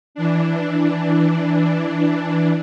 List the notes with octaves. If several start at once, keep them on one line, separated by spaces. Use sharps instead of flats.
E3 D4